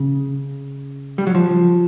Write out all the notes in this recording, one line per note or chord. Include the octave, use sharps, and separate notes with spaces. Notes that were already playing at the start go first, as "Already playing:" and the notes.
Already playing: C#3
G3
F#3
F3